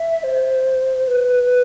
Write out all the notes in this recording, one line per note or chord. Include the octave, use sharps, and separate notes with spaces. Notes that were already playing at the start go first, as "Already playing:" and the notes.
Already playing: E5
C5
B4